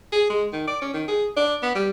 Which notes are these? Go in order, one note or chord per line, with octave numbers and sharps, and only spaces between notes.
G#4
G#3
D#3
D5
C#4
D#3
G#4
D4
B3
G3